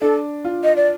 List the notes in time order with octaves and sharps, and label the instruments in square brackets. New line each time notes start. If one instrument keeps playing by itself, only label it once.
[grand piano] D4 [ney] A4
[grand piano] F4
[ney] D#5
D5